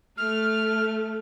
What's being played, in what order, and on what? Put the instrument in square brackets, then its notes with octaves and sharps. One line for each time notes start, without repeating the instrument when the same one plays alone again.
[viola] A3 [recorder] F6